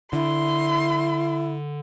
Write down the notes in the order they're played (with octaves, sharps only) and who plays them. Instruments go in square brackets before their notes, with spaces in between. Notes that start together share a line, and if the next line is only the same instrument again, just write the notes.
[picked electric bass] D3 [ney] E4 [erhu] C6